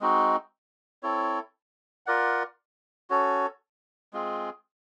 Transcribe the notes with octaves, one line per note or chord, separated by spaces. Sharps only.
G#3 C4 D#4 F#4
C4 E4 A4 C#5
F4 A#4 D5 F#5
C#4 F#4 A4 C#5
G#3 C4 F4 G#4